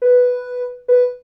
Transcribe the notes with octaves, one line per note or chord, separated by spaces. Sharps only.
B4
B4